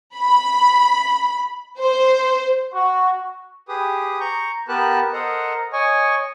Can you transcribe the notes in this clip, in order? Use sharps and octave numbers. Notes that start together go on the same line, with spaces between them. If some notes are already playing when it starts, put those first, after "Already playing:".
B5
C5
F#4
G4 G#4 B4 D#6
A#5 C#6 G6
B3 G4 A#4 B4 A5 F#6
A4 A#4 C5 D#5 F#5 A#5
C#5 D#5 G#5 C#6